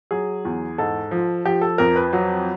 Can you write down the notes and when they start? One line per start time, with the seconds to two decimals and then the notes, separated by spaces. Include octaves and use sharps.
0.11 F#3 G#4
0.45 E2
0.78 G#2 A4
1.11 F3
1.45 F3 G4
1.61 A4
1.78 F2 A#4
1.96 B4
2.13 F#3